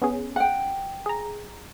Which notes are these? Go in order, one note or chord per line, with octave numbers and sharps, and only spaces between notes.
B3 C#4 G#4
F#5 G5
G#4 A#5